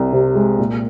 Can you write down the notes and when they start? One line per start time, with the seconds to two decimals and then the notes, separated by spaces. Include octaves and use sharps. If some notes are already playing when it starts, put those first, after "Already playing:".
Already playing: C2 C3
0.13 C3
0.35 G#3
0.58 A#2